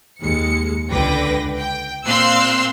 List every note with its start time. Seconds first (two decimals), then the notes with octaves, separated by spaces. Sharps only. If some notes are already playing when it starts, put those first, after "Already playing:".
0.20 D#2 G#3 C#7
0.91 C#2 D3 B4 G5 A#6
1.57 G5
2.06 A#2 C4 F5 C6 E6 F#6